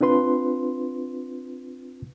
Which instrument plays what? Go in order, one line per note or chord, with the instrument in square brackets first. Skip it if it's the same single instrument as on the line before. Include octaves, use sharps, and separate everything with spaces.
[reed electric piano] C4 D4 F4 B4 C6